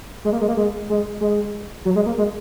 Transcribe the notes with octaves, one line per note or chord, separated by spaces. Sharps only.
G#3
A#3
G#3
A#3
G#3
G#3
G#3
F#3
G#3
A#3
G#3